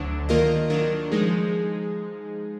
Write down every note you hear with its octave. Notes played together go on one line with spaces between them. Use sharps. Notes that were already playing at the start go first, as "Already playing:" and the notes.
Already playing: D2 D3 F#3 D4
D#3 A#3 F4 A#4 D#5
D#3 F#3 D4 F4 A#4
F3 G#3 D#4 G#4